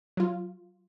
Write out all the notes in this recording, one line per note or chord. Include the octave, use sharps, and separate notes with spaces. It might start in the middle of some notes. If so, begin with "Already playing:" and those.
F#3 F4